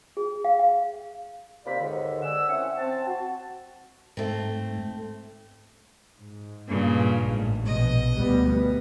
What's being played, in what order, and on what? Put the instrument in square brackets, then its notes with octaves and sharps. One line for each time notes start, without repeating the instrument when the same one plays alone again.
[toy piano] G#4
F5
F5
[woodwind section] D#2 C3 A#3 F4 D5 B5
D#2 G#2 D3
D5 F#5 G#5 E6
C4 C#4 E4 F#5
C4 A5
F#4
[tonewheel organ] G#2 [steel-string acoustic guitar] A3 C4
[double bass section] G#2
[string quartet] G2 A#2 C#3
[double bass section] A1 G#2
[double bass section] A#1 B2 [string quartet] D#5
[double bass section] D2 G3 B3
B3